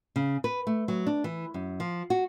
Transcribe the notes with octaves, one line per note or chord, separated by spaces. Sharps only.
C#3
B4
A3
F#3
D4
E3
F#2
F3
F#4